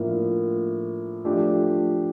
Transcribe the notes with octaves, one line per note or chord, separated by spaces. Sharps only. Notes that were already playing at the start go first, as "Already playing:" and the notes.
Already playing: A2 F3 A#3 D4 F4
F3 A3 D4 G4